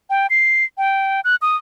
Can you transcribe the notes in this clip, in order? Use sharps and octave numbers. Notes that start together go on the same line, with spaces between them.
G5
C7
G5
F#6
D#6